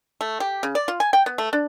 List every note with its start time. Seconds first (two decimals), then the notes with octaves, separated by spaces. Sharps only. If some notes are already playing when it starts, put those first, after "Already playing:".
0.21 A3
0.40 G4
0.63 C#3
0.75 D5
0.88 F4
1.00 G#5
1.13 G5
1.26 B3
1.38 A3
1.53 D4